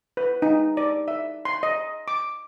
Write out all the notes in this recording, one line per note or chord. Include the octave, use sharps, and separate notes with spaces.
B4
D#4
D5
E5
C6
D#5
D6